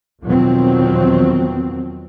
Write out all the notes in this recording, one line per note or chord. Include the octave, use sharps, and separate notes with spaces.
E2 B2 D#3 F3 F#3 C4